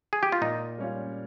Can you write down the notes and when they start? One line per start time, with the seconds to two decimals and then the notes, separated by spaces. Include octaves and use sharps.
0.13 G#4
0.23 G4
0.32 F4
0.41 A#2 D#4
0.78 G3 C#4 F4